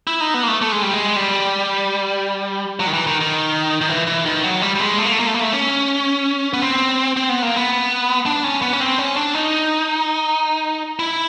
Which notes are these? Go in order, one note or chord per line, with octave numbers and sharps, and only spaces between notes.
E4
D#4
B3
A#3
A3
A3
G#3
G3
G#3
G3
F#3
D#3
E3
D#3
D#3
D#3
E3
E3
D#3
F#3
G3
G3
G#3
A3
A#3
A3
A#3
A3
A#3
A3
C#4
B3
C4
C4
B3
A#3
B3
D4
C#4
B3
C#4
C4
C#4
D4
D#4
E4